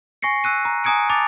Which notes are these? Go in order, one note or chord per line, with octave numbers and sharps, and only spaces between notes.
G#5 C#6 A#6 C7 C#7
E6 F#6 D#7
A#5
G#5 A#5 D#6 G#6 C#7 D7
A5 D6 A6 F7